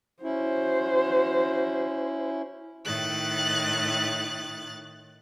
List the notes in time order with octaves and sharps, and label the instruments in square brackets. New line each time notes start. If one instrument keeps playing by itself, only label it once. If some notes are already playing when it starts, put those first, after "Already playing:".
[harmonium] C#4 E4 [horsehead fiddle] F#4 C5
[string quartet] A2 D#3 F#6 A6